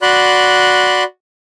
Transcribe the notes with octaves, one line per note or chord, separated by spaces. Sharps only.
F#4 D5 B5 C6 F#6